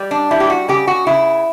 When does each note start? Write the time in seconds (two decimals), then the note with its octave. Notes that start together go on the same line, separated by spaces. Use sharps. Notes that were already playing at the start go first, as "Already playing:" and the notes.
Already playing: G3
0.11 D4
0.31 G3 E4
0.40 G4
0.50 F#4
0.68 C#3 G4
0.87 F#4
1.07 C#3 E4